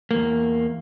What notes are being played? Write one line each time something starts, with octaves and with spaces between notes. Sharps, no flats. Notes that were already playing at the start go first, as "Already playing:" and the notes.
E2 A#3